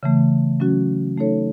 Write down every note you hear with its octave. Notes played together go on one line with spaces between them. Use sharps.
C#3 E3 A3
F#3 C#4 F#4
A3 D#4 A4 C#5